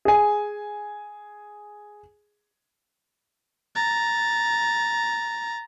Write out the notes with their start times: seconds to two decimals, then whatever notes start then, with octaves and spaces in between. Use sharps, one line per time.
0.05 G#4 G#5
3.75 A#5 A6